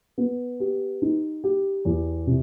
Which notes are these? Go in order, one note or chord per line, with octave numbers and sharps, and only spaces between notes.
B3
G4
D#4
G4
E2
C3